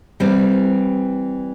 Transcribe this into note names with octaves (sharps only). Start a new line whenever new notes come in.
E3 G3 C4